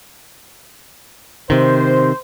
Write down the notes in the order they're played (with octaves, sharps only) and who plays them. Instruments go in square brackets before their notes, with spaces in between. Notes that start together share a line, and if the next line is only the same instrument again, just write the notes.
[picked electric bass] C3 D#3 [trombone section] C5